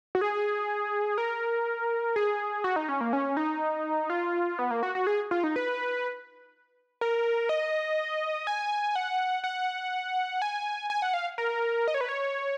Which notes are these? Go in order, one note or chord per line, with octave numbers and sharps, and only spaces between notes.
F#4
G#4
A#4
G#4
F#4
D#4
C#4
A#3
C#4
D#4
F4
B3
A#3
F#4
F#4
G#4
F4
D#4
B4
A#4
D#5
G#5
F#5
F#5
G#5
G#5
F#5
F5
A#4
D#5
C#5
B4
C#5